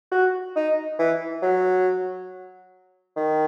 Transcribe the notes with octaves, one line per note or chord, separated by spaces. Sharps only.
F#4
D#4
E3
F#3
D#3